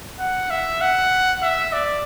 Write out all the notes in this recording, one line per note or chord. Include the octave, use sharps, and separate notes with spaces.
F#5
E5
F#5
E5
D5